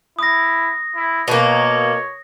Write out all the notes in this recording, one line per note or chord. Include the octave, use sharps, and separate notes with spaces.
E4 D#6 A#6
E4
B2 A#3 C#5